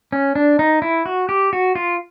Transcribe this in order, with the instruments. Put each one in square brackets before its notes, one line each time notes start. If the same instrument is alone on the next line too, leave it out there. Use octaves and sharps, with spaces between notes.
[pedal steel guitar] C#4
D4
D#4
E4
F#4
G4
F#4
F4